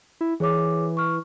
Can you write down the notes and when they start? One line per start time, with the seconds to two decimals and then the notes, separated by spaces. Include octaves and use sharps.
0.21 E4
0.40 E3 G#4 C#5 D6
0.97 C#6 F6